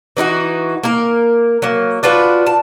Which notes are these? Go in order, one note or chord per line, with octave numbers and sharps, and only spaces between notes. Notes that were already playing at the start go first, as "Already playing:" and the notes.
E3 D#4 E4 F#4
A#3 A#4
F#3 A#3
D4 F4 F#4 B4
A5